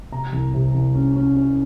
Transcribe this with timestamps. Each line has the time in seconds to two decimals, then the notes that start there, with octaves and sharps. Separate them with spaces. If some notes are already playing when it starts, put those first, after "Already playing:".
0.12 C3 A#5
0.32 C2
0.54 C3
0.75 C2
0.95 C#4
1.16 C#4
1.36 C#4